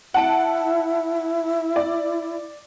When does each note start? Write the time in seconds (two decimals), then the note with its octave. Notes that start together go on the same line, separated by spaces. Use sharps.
0.14 E4 F#5 A5 D7
1.76 D5